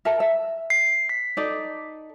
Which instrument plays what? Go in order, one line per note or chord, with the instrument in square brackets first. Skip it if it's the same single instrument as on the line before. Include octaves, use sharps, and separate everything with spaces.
[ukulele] A#4 E5 A5
E5
[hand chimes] C7
B6
[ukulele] D#4 A4 D5